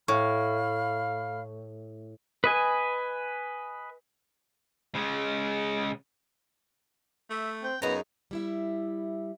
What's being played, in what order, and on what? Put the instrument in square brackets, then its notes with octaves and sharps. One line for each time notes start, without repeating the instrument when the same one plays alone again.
[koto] A2 [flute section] F5 B5 F6 [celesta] C#6
[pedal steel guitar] B4 D#5 G#5
[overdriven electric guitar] C#3 G#3
[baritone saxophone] A3 [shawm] E5
[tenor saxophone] C4 [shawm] G5
[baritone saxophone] F#2 [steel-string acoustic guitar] C#3 D#4 [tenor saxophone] B3 [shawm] A#5
[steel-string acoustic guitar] G3 E4 E5